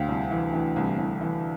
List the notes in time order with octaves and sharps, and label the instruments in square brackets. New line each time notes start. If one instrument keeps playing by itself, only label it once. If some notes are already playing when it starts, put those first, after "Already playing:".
Already playing: [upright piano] D2 F5 G5
C2
E3
E3
C2
C2
E3